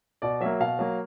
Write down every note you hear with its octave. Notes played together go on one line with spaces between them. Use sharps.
B2 D5
F#3 A#3 E5
B2 F5
F#3 A#3